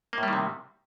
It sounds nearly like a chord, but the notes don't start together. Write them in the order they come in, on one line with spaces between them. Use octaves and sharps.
A#3 A2 G3 D#3 C3